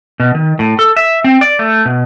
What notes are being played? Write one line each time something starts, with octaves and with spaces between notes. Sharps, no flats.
B2
D#3
A2
A4
E5
C4
D5
A3
B2